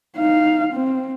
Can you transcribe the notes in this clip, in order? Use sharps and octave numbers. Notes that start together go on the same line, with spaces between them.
D#4 F5
C4